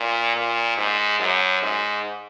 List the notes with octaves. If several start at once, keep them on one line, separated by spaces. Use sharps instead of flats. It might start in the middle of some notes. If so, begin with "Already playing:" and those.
Already playing: A#2
A#2
G#2
F#2
G#2